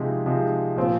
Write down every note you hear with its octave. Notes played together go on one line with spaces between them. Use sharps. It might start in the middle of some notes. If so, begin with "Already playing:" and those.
Already playing: C3 F3 G#3 D#4
C3 F3 G#3 D#4
A#2 F3 C4 F4